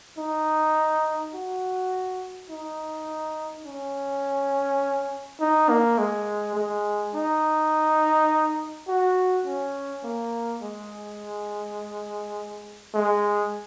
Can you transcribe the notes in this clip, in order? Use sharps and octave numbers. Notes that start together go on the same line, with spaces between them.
D#4
F#4
D#4
C#4
D#4
A#3
G#3
G#3
D#4
F#4
C#4
A#3
G#3
G#3